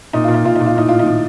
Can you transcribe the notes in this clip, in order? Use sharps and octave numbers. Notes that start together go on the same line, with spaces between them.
A#2 D#4
A#2 F4
D#4
A#2 F4
A#2 D#4
F4
A2 D#4
A2 F4
D#3 D#4
A2